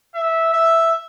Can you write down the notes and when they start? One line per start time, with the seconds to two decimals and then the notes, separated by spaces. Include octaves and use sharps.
0.15 E5
0.53 E5